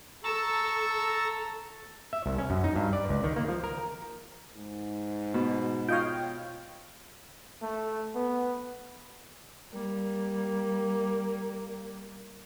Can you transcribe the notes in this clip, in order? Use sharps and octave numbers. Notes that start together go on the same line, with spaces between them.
A4 A5 A#5 C#6 E6
E5
C2
C#4
F#2
D#4
G2
D5
C#2
D#3
A#3
F3
A#4
G#2
B2
F4 C#5 D#5 F5 G5
A3
B3
G3 A#3